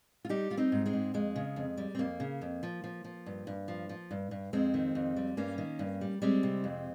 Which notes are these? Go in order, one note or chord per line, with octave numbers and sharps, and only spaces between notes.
F4
G3 D#4 G4
G3 F4
C4 D#4
G#2
G#3 C4
G#2
F2 G#3
C#3
F2
G3
C4
F2 A#3
C#3
F2
F3
F3
F3
G2
G2
F3
F3
G2
G2
F2 G#3 C4
D#3
F2
G3
G2 A#3 C#4
D#3
G2
G3
G3 G#3 C4
C3
F2